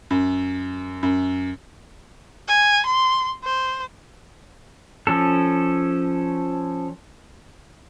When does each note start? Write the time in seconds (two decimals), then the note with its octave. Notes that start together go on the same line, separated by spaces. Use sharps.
0.11 F#2
1.03 F#2
2.48 G#5
2.86 C6
3.44 C5
5.07 F3 C#4 A4